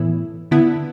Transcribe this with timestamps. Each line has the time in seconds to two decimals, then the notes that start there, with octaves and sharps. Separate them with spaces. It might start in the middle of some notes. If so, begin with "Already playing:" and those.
Already playing: A2 E3 B3 E4
0.51 D3 B3 E4